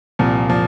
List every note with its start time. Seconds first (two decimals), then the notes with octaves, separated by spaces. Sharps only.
0.19 C2 A#2 F3
0.49 A#2 F3